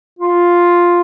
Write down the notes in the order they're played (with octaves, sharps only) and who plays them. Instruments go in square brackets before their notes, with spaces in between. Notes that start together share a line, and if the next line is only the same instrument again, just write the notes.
[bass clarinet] F4